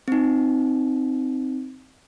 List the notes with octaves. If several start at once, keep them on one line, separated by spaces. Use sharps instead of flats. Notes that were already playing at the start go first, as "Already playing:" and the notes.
C4 D#4